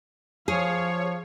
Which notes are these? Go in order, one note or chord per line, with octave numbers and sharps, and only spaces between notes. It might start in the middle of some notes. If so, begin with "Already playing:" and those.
F3 G#4 C#5 F5